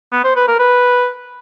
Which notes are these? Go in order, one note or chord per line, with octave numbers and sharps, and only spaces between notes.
B3
C5
B4
A#4
B4